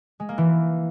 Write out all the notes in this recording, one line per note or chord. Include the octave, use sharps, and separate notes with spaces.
G#3
A#3
E3